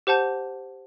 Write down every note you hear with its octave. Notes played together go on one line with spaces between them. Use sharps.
G4 C5 F#5 A5 G6